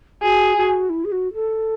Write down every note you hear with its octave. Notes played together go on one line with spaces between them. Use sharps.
F#4 G#4
F#4
E4
G#4
F#4
A4